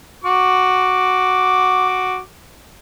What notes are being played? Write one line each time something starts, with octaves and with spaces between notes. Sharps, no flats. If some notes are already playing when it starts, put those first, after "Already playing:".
F#4 D6